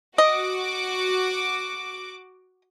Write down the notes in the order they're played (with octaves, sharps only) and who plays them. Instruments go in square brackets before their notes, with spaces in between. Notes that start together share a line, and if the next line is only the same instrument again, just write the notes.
[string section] F#4 D6 [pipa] D#5